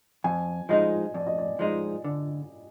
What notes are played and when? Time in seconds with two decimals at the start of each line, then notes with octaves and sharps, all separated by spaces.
0.24 F2 G#5
0.69 F3 G#3 D#4 D#5
1.14 F2 D5
1.26 D#5
1.38 D5
1.59 F3 G#3 D#4 D#5
2.04 D3